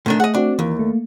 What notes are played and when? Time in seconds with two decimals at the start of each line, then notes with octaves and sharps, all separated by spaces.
0.06 A#2 D#3 A3 D4
0.20 G#4 D#5 F#5
0.34 C4 D4 F#4 D5
0.59 D#2 E3 A#3
0.79 A3